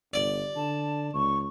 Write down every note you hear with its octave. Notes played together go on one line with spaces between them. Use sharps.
G1 D5
D3 A5
C#2 C#6